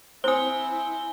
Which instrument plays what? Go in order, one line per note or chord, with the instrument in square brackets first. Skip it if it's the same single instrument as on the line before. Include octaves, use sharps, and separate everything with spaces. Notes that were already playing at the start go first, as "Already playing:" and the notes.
[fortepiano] C4 [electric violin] E4 [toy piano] C5 D#6 [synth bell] G#5 G7